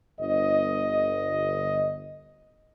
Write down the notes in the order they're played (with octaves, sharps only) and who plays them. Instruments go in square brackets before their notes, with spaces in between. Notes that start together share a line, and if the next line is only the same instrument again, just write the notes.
[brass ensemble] G1 D#5